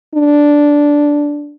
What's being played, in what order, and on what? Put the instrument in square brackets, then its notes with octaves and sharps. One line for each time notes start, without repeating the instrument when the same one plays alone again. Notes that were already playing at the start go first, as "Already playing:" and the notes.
[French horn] D4